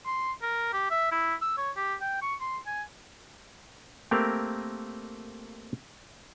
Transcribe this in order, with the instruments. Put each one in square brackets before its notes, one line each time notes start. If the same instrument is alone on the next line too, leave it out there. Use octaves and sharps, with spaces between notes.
[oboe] C6
A#4
G4
E5
E4
E6
C#5
G4
G5
C#6
C6
G#5
[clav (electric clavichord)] A3 A#3 C4 G4 A#4